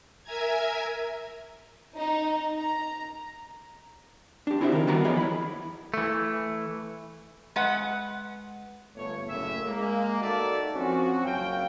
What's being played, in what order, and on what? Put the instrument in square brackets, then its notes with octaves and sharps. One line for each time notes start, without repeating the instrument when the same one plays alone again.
[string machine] A#4 E5 G#5 A#5 G#6
[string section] D#4
A#5
[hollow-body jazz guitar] D4 G4
C4 E4 F#4 C5 D5 E5
D#3 A#4
D#3 G3 B3 F#4 A#5 B5
E3 F3 G#4 C#5 D#5
E4 B5
[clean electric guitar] E3 A3
[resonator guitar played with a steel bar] G#3 B4 F#5
[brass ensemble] G1 A3 C#5
F#1 A2 C#3 A#3 E5
G#3 A#3
D#4 F#4 A4 A#4 D5 E5
F3 C4 C#4 F#4
F#1 F#2 F5 G5